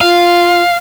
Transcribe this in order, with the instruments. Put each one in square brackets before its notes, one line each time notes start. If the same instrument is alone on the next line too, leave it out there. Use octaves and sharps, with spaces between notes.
[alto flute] F4 [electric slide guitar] F5